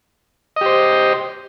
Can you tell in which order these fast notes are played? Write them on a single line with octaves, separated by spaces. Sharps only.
D#5 G4 C5